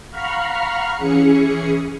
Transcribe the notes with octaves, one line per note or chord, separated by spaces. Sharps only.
F5 F#5 A#5 B5 C#6 F6
E3 C#4 G#4 C#7